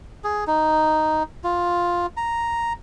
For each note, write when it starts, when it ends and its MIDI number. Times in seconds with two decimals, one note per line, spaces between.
0.24 0.44 68
0.47 1.23 63
1.44 2.06 65
2.17 2.73 82